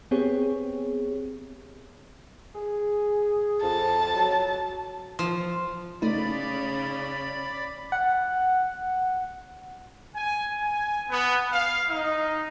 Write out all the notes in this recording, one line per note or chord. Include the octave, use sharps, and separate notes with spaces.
B3 C4 G4 G#4 C#5
G#4
F2 A5
F#3
F3
C#3 A3 C#4 D#4 D5 B5
F#5
G#5
G#5
B3
F5
D#4